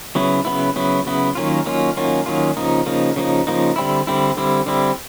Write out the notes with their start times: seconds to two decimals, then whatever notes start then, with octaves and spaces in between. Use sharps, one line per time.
0.15 C#3 F#3 B3 E4
0.45 C#3 F#3 B3 E4
0.76 C#3 F#3 B3 E4
1.06 C#3 F#3 B3 E4
1.35 D#3 F#3 A#3 C#4 F4
1.66 D#3 F#3 A#3 C#4 F4
1.96 D#3 F#3 A#3 C#4 F4
2.26 D#3 F#3 A#3 C#4 F4
2.57 C#3 F3 A#3 D#4
2.86 C#3 F3 A#3 D#4
3.16 C#3 F3 A#3 D#4
3.47 C#3 F3 A#3 D#4
3.76 D3 G3 C4 E4
4.07 D3 G3 C4 E4
4.37 D3 G3 C4 E4
4.66 D3 G3 C4 E4